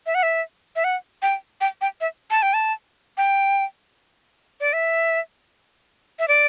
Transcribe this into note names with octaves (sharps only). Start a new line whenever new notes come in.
E5
F#5
E5
E5
F#5
G5
G5
G5
E5
A5
G5
A5
G5
D5
E5
E5
D5